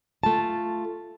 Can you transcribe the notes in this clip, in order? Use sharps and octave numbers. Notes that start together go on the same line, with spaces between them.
A3 F4 A5